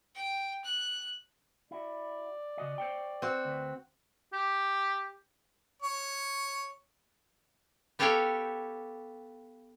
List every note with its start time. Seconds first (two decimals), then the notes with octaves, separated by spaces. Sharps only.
0.15 G5
0.64 F#6
1.71 E4 F#4 D5
2.57 C#3 F#4 D#5
2.78 C5 C#5 G5
3.22 C4 F#4
3.45 D2 B4
4.33 G4
5.82 C#5
7.99 B3 G4 A4 C#5 F5 G5